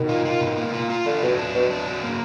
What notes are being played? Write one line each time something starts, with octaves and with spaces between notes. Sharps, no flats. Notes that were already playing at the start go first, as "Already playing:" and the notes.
Already playing: B2 D#3
F4
F4
B2
A#3
F4
F4
D3 D4
B2 F#3
D4
B2 F#3
D4
F#3
A#3